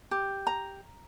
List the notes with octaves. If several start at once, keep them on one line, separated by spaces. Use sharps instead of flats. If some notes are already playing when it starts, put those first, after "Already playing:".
G4
A#5